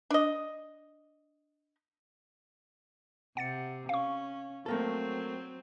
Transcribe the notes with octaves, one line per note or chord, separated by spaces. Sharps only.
D4 D#5
C3 F#5 A6 C#7
C#4 F5 C#6
F#3 A3 A#3 C4 A4